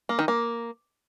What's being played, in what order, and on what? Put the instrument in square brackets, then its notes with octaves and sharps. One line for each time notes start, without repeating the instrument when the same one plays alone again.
[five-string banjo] A#3
D#3
A#3